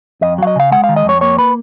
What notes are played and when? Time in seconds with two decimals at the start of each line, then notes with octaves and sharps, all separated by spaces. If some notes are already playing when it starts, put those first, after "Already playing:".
0.21 F2 D#5
0.38 F#3 F5
0.47 D#5
0.56 C#3 F5
0.72 G#3 F#5
0.84 F5
0.89 D#3
0.96 D#5
1.05 F2 C#5
1.21 A#3 C#5
1.38 B4